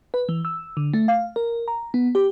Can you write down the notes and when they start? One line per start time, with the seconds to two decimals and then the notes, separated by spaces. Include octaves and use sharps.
0.14 B4
0.29 E3
0.45 E6
0.77 D3
0.94 A3
1.08 F5
1.36 A#4
1.68 A#5
1.94 B3
2.15 G4